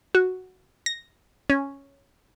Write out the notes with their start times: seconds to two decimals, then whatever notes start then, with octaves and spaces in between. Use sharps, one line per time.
0.15 F#4
0.86 A#6
1.50 C#4